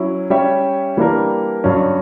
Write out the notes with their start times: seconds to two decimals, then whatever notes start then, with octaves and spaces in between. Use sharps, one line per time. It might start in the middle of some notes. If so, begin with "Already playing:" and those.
Already playing: F#3 C#4 E4
0.30 G3 C#4 G4 C#5 E5
0.97 E3 G3 A#3 D4 A#4
1.64 G2 F#3 C#4